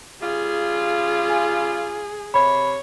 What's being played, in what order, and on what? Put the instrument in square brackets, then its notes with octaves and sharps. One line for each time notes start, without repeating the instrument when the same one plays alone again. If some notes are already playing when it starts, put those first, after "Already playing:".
[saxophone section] C#3 G3 F4 [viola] G#4
[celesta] G#5
[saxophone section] C3 C#5 [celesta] B5